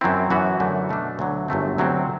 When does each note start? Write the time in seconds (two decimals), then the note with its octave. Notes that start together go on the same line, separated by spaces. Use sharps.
0.01 F#2 F#3 C4 E4
0.30 F#2 E3 B3 F#4
0.60 F#2 D3 A3
0.89 B2 A3 D4
1.19 D2 D3 F#3
1.48 G1 F#2 F#3 A3 C4
1.78 D2 C3 F#3 C4